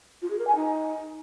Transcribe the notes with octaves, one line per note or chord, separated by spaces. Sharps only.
F4
G#4
A#4
G#5
D#4